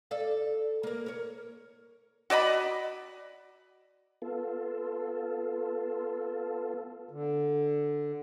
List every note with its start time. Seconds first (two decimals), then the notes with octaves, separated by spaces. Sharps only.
0.11 A4 D5 F5
0.83 A#3 A#4
1.06 A#4 C#5
2.30 F#4 D5 D#5 B5
4.22 B3 F4 A4
7.11 D3